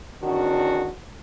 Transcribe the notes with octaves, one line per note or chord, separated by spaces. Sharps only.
E2 D#3 C#4 D4 F#4